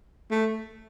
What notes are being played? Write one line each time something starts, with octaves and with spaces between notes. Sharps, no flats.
A3